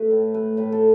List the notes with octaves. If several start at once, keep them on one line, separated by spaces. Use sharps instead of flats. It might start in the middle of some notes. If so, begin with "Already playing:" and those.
Already playing: A3 B4
A2
A3 B4
A2 B4
A4